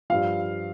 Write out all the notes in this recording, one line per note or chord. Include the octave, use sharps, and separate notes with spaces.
G2 F3 F5